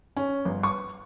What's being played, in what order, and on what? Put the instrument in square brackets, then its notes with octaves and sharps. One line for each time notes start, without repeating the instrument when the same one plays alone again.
[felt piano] C#4
G1
C#6